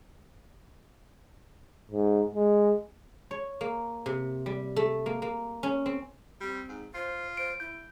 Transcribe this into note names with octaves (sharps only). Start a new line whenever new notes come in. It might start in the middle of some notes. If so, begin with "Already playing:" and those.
G#2
G#3
C#5
A#3
C3
G3
A3
A#3
A#3
C#4
C4
G3 C4
G#2
F4 C5
C5 D7
E4 G6